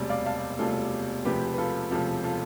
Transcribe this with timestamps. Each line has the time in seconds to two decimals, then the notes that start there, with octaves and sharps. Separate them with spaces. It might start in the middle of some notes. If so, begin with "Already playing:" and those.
Already playing: E1 D2 C3 G3
0.09 D5 F5
0.26 F5 A5
0.59 E1 D2 C3 G3 F4 A4
1.25 E1 D2 C3 F3 G4 B4
1.54 B4
1.58 F4 A4
1.91 E1 D2 C3 F3 F4 A4
2.24 F4 A4